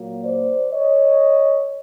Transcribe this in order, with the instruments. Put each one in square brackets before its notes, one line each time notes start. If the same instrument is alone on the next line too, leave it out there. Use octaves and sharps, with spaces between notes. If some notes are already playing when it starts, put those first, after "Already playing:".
Already playing: [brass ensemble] A#2 F#3 A#3
C5 D5
C#5 D#5